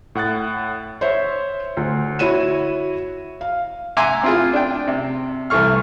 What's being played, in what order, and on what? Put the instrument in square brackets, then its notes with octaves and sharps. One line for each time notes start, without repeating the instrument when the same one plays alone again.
[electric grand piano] A2 F#5 F#6 A6
[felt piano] C5 C#5 E5
D2
E4 F#4 C#5 D#7 E7
F5
[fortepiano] E5 F#5 G#5 A#5 C6 D6
C4 E4 F4 G#4
D4 G5
C3
C2 E3 A3 C#6 F6